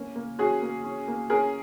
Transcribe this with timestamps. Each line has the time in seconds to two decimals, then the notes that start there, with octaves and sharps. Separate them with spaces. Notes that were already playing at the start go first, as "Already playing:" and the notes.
Already playing: A#3 C#4
0.16 A#3
0.39 C#4 F#4 G#4
0.62 A#3
0.84 C#4
1.08 A#3
1.30 C#4 G#4 A#4